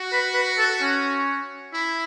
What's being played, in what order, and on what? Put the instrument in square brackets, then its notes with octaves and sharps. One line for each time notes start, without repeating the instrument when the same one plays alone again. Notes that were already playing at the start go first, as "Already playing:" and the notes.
Already playing: [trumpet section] F#4
[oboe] B4
B4
A4
C#4
[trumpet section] E4